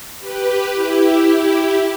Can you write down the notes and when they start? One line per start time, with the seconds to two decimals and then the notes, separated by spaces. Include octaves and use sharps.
0.21 G4 B4
0.74 E4 G4
1.27 E4 G4